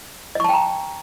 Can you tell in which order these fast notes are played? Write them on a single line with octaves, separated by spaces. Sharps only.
D#5 C#6 A5 G5 A#5